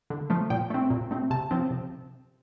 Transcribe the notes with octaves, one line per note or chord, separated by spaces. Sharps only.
D3
F3 A3
A#2 G5
A3 C4
A#2
A3 C4
C3 A5
F3 C4
C3